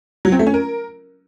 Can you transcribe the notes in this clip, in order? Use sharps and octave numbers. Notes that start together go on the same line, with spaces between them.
F#3
C4
A3
C#4
A#4